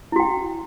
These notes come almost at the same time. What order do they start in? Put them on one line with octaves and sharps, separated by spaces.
E4 F#4 G5